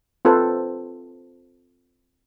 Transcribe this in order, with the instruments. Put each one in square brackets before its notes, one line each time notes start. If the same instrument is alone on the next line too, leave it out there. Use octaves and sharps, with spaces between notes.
[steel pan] C4 F4 A4 B4 C5